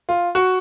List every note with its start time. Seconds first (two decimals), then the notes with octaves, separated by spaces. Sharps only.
0.09 F4
0.35 F#4